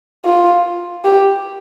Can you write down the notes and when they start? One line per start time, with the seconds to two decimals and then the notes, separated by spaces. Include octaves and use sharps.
0.25 F4
1.05 G4